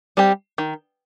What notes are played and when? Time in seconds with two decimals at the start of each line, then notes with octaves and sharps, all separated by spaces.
0.17 G3 C4 G4
0.58 D#3